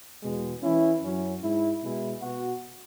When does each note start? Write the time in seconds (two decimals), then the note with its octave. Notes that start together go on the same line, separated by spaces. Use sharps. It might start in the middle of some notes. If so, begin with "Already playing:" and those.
0.23 E2 B2 G#3
0.62 E3 C#4 E4
1.03 F#2 F#3 C#4 E4
1.41 G#2 G#3 E4
1.81 B2 G#3 E4
2.21 B2 B3 F#4